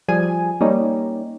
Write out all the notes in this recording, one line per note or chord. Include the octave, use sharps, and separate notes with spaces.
F3 G3 G#4 G#5
G3 A#3 C#4 D#4